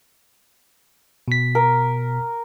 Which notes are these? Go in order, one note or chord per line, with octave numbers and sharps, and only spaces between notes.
B2 B6
A#4